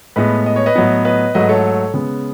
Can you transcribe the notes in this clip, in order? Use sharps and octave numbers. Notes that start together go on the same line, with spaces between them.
A2 G#3 B3 B4 D#5
D#5
C#5
B4 D#5
A2 F#3 B3
B4 D#5
G#2 F#3 A3 B4 D#5
A4 C#5
C#3 G#3 B3